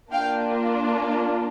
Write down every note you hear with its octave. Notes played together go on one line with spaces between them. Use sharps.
A#3 D4 F4 F5 G5